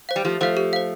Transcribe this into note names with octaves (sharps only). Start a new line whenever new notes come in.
C5 F5
G3
F3 A3 G4
F3 A3 C5 F5
G4
C5 F5